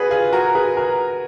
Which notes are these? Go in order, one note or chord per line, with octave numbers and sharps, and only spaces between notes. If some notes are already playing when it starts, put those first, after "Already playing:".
Already playing: D4 F#4 G#4 B4
F4 G#4
F#4 A#4
G#4 B4
F#4 A#4